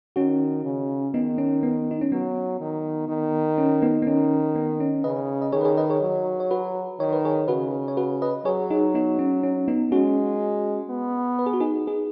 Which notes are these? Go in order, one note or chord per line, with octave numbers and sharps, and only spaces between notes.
D#3 C#4 F#4
C#3
D#3 B3 D#4
C#4
B3
D#4
C#4
F#3 B3
D#3
D#3
C#4
B3 D#4
B3
D#3 C#4
B3
C#4
C#3 B4 D#5
D#5
D#3 G#4 C#5
B4
G#4 C#5
B4 D#5
G#4 C#5
F#3
C#5
F#4 B4
D#3 C#5
B4
G#4 C#5
C#3 F#4 B4
C#5
F#4 B4
B4 D#5
F#3 G#4 C#5
D#4 G#4
B3 D#4
C#4
C#4
B3 D#4
G#3 C#4 F#4
B3
B4
G#4
F#4
D#4 G#4
D#4 G#4